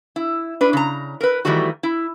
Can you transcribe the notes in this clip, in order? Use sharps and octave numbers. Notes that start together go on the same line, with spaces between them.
E4
D4 B4
C#3 A#5
A#4 B4
D#3 E3 G3 A3 F#4
E4